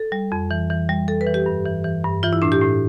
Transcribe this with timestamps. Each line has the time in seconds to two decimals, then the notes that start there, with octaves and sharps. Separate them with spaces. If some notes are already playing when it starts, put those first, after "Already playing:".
Already playing: A4
0.12 G3
0.32 F2
0.51 E3
0.70 E3
0.89 G3
1.08 G3 A4
1.21 B4
1.27 E3
1.34 G4
1.46 G2
1.65 E3
1.84 E3
2.04 G2
2.23 E3 F4
2.33 E4
2.42 A2 D4
2.52 G4
2.61 A2